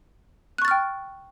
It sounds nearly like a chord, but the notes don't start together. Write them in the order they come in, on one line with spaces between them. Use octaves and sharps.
F#6 C#6 A6 F6 G5